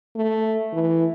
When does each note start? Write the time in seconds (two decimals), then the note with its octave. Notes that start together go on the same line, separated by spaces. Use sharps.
0.16 A3
0.73 E3